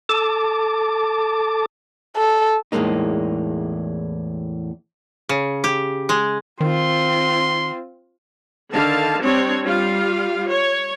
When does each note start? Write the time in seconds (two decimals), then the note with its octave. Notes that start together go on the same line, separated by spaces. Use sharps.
0.09 A4 A5 D6
2.17 A4
2.72 E2 A2 E3 G#3 A#3 D#4
5.29 C#3
5.64 G4
6.09 G#3
6.61 D#3 C4 F4 C6
8.72 D3 D#3 F5 A5
9.21 G3 C4 D4 C#5
9.63 G3 F4 F5
10.47 C#5